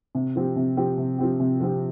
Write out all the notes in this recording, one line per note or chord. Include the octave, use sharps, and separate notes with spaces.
C3
F3 C4 G4
C3
F3 C4 G4
C3
F3 C4 G4
C3
F3 C4 G4